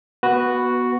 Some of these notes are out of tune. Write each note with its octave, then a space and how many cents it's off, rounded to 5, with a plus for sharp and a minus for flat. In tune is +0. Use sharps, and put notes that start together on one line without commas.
B3 -15 F#4 +0 B4 +0